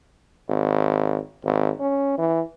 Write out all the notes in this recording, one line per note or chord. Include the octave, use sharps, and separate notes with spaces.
G#1
G#1
C#4
E3